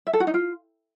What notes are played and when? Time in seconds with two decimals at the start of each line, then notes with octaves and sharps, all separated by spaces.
0.07 E5
0.13 A4
0.20 F#4
0.27 D#4
0.34 F4